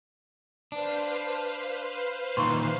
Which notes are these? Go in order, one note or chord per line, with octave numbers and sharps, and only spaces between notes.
D4 B4 C5 F5
A#2 D#3 E3 C6 C#6